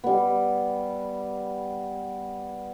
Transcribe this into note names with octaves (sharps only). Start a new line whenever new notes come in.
G3 B3